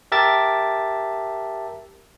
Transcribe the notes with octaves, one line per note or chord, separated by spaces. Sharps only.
G4 A#4 E5 A5 A6